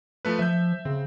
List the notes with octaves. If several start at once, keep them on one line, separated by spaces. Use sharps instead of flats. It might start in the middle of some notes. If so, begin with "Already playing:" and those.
F3 A3 B4
F3 E5 G6
C#3 C4